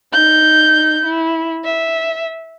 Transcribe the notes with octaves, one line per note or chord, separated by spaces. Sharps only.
D#4 G6
E4
E5